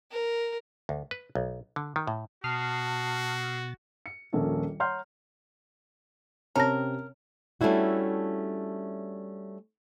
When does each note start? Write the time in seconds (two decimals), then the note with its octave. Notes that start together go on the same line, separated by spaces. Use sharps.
0.12 A#4
0.89 D2
1.11 B4
1.35 B1
1.76 D3
1.96 D#3
2.07 A2
2.44 B2 F#4 A5 D#6 F6 A6 C7
4.06 C#7
4.33 D#1 A#1 A#3 C#4 A4
4.80 C#5 F#5 A#5 C6 F6 G6
6.56 C3 C4 C#4 A#4 C#5 A5 A#6
7.61 G3 A3 C#4 D4 E4 F#4